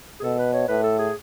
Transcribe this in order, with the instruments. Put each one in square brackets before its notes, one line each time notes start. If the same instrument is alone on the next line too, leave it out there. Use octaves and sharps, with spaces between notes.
[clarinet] G#4
[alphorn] B2 [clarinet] A4
[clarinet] B4
C#5
[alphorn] A2 [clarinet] B4
[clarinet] A4
G#4